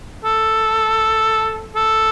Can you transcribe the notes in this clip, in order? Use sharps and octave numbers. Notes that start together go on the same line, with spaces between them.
A4
A4